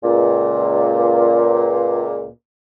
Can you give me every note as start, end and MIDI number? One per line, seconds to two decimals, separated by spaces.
0.03 2.28 37
0.03 2.28 46